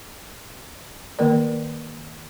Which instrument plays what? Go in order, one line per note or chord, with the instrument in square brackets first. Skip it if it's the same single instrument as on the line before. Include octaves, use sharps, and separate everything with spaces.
[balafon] D#3 A#3 A#4 D5